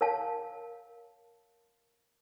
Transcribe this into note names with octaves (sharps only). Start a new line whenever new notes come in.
A#4 C#5 F5 A5